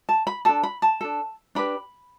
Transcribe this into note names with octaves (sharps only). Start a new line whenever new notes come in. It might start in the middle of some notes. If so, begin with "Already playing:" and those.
A5
B5
D4 A4 A5
B5
A5
D4 A4
D4 G4 B4 B5